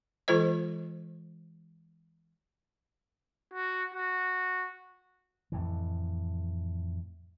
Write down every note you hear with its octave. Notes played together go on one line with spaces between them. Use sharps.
E3 G#3 F4 A4 C5 D#5
F#4
F#4
F2 A2 E3